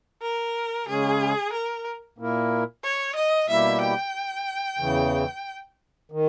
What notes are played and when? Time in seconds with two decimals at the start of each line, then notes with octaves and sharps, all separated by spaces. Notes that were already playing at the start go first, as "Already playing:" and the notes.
0.22 A#4
0.87 C#3 G#3 C#4 G#4
1.52 A#4
2.18 A#2 A#3 E4 A#4
2.83 C#5
3.15 D#5
3.48 B2 G3 A#3 E4 G4 E5
3.81 G5
4.79 E2 C#3 E3
6.12 D#3